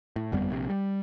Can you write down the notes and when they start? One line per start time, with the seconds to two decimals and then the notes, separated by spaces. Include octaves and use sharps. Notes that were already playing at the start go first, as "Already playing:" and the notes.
0.16 A2
0.32 G1 F2 G3 B3
0.51 A#1 C3
0.70 G3